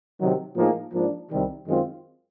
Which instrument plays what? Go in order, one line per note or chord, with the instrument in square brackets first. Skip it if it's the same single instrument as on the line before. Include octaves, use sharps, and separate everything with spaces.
[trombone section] C3 D#3 F#3
A2 F3 A#3 D#4 G#4
G#2 F3 A#3 D4
C2 C3 D#3 G3
F#2 D#3 G#3 C4 F4